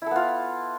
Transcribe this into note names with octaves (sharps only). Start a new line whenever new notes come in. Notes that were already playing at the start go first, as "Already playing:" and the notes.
B3 E4 F4 A4